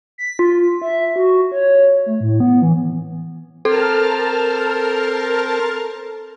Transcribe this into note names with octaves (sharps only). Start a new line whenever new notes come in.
B6
F4
E5
F#4
C#5
A3
A2
B3
E3
C4 A4 A#4 C5 A5 F6